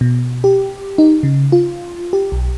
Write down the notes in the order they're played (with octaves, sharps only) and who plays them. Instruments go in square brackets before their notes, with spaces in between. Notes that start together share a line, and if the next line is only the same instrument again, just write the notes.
[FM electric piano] B2
G4
D#4
C#3
F4
G4
B1